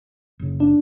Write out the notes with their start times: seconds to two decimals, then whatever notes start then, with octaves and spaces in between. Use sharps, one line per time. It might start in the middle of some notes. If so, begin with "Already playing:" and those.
0.39 F#1 C#3
0.60 D4